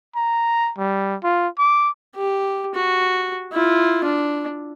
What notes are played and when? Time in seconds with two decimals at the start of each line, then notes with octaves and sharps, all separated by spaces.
0.16 A#5
0.78 G3
1.24 F4
1.58 D6
2.16 G4
2.75 F#4
3.53 E4 F4
4.04 D4